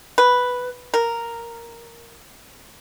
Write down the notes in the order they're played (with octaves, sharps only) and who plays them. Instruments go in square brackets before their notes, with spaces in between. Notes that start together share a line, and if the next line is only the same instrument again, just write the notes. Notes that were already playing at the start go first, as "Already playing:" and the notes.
[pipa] B4
A#4